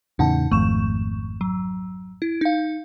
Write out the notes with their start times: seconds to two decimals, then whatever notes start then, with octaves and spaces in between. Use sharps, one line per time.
0.19 E2 A2 C#3 D#4 F#5 A5
0.52 G#1 F2 A3 C#6 E7
1.41 F#3
2.22 E4
2.41 D#4 F5